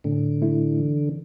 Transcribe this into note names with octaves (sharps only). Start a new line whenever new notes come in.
A2 D3
A3 E4
E3